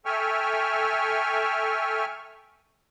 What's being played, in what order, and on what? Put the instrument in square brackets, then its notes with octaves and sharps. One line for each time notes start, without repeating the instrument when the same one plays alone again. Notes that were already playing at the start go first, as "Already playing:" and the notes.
[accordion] A4 E5 G5 G#5 C#6 F6